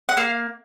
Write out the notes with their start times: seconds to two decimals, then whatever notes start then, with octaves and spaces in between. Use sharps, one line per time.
0.09 F#5
0.17 A#3 F5